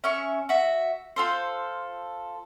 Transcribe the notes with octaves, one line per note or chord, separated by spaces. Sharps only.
C#4 E5 C#6
F#4 E5
F4 A4 C5